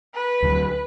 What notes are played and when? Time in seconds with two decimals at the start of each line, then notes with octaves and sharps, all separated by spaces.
0.13 B4
0.43 D2 D3 F#3